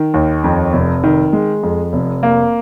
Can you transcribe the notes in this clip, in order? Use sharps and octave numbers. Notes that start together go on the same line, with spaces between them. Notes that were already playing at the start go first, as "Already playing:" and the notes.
Already playing: D#3
D#2
F2
F1
D#3
G#3
F2
F1
A#3